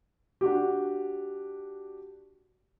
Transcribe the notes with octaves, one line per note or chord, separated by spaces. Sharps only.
D4 F#4 G4